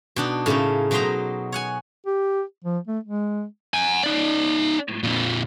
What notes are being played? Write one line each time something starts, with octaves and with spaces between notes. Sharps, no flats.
B2 D4 D#4
A2 C#3 A3 A#3 D#4
B2 F#3 D#4 C5 D#5 A#5
C#5 F#5 G#5
G4
F3
A3
G#3
F#5 G#5
D#4 D5
F2 A#2